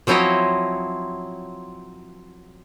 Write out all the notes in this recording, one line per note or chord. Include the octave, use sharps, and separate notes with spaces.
F3 F#3 C4 E4 C#5 D#5